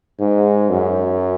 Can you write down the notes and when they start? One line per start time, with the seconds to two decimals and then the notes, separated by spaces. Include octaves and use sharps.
0.20 G#2
0.70 F#2